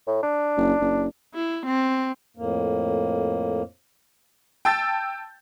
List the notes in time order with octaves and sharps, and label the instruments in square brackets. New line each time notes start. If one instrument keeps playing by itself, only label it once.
[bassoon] A2
D4
[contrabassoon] F#1
F#1
[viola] E4
C4
[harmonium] F2 A2 A#3
[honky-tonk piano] G5 A5 E6 G6 A6